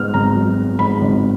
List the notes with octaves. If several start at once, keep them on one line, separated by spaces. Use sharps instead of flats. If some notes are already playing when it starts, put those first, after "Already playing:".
Already playing: G#2 B3 F6
G#1 A#5
F#3
B3
G#2 B5
G#1